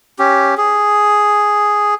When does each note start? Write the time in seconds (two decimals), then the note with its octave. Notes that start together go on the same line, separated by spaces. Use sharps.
0.19 C#4 G4
0.57 G#4